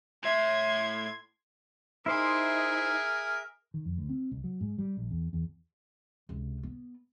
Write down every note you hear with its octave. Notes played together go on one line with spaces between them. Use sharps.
A2 E5 C6 G#6
D#4 E4 G#4 A#4 C5 E5 C6
D#3
F2
D2
C4
C2
F#3
G#2
G3
A#1
E2
E2
C#2 C3
B3